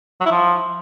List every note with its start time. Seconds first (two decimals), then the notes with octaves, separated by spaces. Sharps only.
0.21 F#3
0.26 E4
0.31 F3